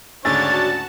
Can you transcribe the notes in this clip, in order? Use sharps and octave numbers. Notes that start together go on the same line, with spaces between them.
D2 G#2 C#3 D4 F#4 C#5 A5 A6